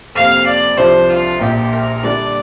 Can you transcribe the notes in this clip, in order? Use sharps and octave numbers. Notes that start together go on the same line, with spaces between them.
F2 C3 A#3 F5
D5
C2 C3 F3 D4 C5
F4
A#1 A#2 A#3 G4
A#4
D3 G3 D4 D5